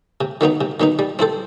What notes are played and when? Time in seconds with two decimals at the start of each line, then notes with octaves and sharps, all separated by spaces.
0.21 C3
0.41 D#3 F#3 B3 D#4
0.61 C3
0.80 D#3 F#3 B3 D#4
0.99 G3
1.19 C4 E4 A4 C5